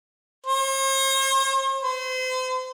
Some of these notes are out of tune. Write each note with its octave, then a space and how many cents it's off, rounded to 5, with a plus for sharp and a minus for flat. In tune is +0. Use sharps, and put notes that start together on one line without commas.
C5 +45
C5 -35